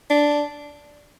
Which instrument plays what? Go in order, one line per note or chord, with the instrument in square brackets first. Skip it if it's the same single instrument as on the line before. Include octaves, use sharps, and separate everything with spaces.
[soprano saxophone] D4